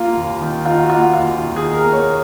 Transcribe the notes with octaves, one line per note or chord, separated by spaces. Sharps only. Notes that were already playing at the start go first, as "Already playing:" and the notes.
Already playing: A#3 F4
D#2
D#3
D#4 F4
F#4
A#3 F4
D#2 F4
D#3
G#4
D#4
A#4
A#3
C#5